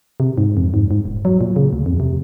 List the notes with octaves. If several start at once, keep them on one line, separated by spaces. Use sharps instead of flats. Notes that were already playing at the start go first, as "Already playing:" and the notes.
C3
G#2
F2
G#2
G#2
D#1
F#3
A#2
C#3
D2
F2
C3